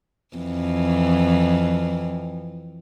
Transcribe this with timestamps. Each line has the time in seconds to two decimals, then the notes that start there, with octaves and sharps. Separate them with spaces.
0.36 F2 E3